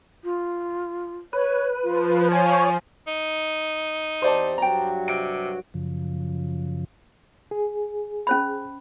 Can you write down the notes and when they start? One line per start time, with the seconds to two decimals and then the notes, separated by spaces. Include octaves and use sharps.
0.24 F4
1.33 B4 C#5
1.83 F3 F4
2.32 C#5 G#5
3.07 D#4
4.22 E2 C4 G4 C5 D5 A5
4.58 G2 F#3 F#4 G5 A#5
5.08 C3 D7
5.74 F#2 C#3 F3
7.51 G#4
8.27 C#4 C5 B5